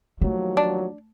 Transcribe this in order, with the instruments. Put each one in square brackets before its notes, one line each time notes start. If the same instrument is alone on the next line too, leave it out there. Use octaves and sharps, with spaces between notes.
[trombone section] D#2 F3 F#3 [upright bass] A3
[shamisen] D4